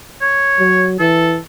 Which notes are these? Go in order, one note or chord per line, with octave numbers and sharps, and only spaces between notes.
C#5
F#3
E3 A4